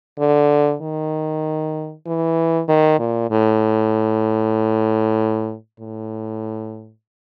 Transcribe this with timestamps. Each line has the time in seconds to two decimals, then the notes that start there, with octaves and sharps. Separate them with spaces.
0.19 D3
0.82 D#3
2.06 E3
2.68 D#3
2.99 A#2
3.31 A2
5.80 A2